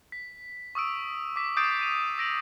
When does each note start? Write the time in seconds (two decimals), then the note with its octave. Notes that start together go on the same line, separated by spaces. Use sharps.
0.12 B6
0.75 C#6 D#6 E6 D7
1.36 D6 B6
1.56 D6 D#6 G6 A6 C7 D7
1.79 D7 D#7 F7
2.18 E6 A#6 D7 F#7